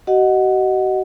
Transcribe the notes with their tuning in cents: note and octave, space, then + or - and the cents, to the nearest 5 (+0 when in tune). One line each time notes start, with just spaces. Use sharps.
F#4 +45 D#5 +0 F#5 +0